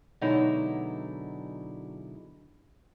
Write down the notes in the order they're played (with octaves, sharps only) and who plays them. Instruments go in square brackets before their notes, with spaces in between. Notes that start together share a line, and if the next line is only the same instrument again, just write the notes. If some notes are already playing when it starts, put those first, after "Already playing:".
[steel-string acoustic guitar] B2 D3 F#3 G#3 D#4 E4